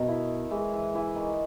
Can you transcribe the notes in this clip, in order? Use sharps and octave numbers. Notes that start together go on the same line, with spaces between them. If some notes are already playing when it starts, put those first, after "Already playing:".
Already playing: B2 D#3
E4
E3 G#3
E3
E3 E4
D#3